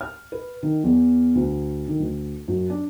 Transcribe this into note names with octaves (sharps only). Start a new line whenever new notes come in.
F6
B4
D#3
E2
D2
D#3
D2
F#2
D4